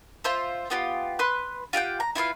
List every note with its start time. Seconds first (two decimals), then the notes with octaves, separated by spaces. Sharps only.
0.24 F4 C5 E5
0.70 B3 F4 G4
1.19 B4 C6 F#6
1.73 F4 G4 F#5 G5
2.00 A#5
2.15 E4 F4 B4 F5